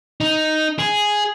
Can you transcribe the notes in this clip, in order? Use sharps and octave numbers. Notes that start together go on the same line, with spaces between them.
D#4
G#4